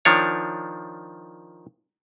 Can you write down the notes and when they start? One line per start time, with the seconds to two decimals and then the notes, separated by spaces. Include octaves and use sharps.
0.05 D#3 F3 D4 C#5